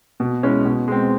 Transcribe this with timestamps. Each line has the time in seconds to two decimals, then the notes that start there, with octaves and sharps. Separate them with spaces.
0.20 B2
0.43 G#3 C#4 E4
0.65 B2
0.88 G#3 C4